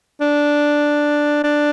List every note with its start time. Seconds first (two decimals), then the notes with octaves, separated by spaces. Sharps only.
0.21 D4
1.44 D4